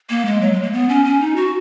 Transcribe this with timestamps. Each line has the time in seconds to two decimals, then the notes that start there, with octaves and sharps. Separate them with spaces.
0.10 A#3
0.25 G#3
0.41 F#3
0.52 G#3
0.62 A#3
0.72 B3
0.89 C#4
1.05 C#4
1.21 D#4
1.36 F#4